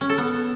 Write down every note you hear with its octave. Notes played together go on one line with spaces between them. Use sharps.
C#4
A4
B3